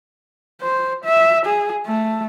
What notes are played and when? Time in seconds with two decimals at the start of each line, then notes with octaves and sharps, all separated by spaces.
0.62 C5
1.05 E5
1.46 G#4
1.87 A3